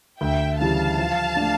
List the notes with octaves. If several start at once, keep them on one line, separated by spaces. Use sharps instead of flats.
D2 E5 G5
C#3 E3 G3 F5 A5
F3
A3 D4